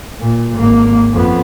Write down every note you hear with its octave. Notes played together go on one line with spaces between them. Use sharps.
A#2
G#1 A#3
F2 B3